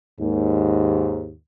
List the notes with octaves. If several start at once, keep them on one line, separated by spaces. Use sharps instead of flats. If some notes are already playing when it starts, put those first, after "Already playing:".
D#2 G#2